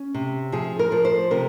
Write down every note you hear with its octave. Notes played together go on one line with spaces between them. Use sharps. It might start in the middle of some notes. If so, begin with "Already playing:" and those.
Already playing: C#4
C3
F3 G#4
A#4
F3
C5
C3 A#4